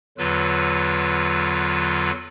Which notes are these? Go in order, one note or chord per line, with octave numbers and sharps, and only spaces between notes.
E2 D3 F#3 F4 B4 E6